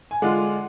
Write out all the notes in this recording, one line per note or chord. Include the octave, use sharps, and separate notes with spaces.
G#5
D3 G#3 D4 F4 F#5